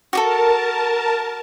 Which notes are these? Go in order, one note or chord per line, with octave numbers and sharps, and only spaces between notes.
F#4 G4 A4 A#4 A5